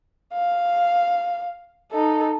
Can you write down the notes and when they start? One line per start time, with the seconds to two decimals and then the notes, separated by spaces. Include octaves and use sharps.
0.33 F5
1.92 D#4 A4